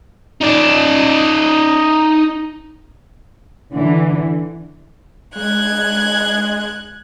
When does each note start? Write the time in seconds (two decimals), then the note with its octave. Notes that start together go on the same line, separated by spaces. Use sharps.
0.41 D#4 D5
3.73 D3 E3
5.36 G#3 F#6 G#6